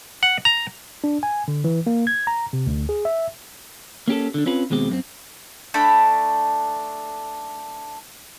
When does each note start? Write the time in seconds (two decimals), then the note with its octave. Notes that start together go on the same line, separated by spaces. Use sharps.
0.23 F#5
0.45 A#5
1.04 D4
1.23 G#5
1.48 D3
1.64 E3
1.87 A#3
2.07 G#6
2.27 A#5
2.53 C3
2.67 D2
2.89 G#4
3.05 E5
4.08 A#3 C#4 G4 A4
4.34 D3 D4
4.46 C4 C#4 F4 B4
4.70 D#2 B2 G#3 C4 G4
4.90 F#2 A#3 C4
5.74 A3 D4 B5